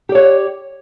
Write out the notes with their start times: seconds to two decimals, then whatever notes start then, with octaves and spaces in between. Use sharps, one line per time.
0.09 G4
0.12 D5
0.15 C#5